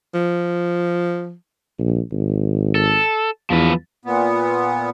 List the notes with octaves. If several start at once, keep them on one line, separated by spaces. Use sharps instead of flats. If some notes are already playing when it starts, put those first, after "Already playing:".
F3
A#1
G#1
A4
E2 F3 B4
A#2 B3